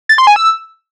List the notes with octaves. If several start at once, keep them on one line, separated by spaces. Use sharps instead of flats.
A6
C6
G#5
E6